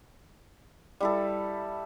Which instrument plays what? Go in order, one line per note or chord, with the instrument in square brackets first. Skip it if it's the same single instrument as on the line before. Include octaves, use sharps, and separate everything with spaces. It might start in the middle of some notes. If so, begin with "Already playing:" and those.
[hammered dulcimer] G3 E4 A4